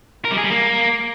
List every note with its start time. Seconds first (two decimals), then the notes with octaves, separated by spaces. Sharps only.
0.25 A#4
0.31 G3
0.37 G#4
0.44 G3
0.50 A#3